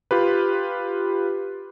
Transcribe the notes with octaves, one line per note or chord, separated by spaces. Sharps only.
F4 G4 B4